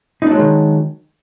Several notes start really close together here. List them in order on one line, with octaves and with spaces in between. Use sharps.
D#4 D4 F#3 G#3 D#3